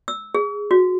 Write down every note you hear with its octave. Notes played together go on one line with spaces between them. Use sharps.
E6
G#4
F#4